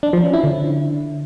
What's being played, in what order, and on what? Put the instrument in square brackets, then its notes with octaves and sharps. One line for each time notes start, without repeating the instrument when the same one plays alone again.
[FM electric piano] D4
F3
C#4
E4
D3